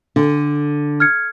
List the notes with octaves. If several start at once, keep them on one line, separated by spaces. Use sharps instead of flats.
D3 D4
F6 G#6 C#7